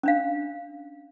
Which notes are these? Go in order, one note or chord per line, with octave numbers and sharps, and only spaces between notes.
C#4 D4 F5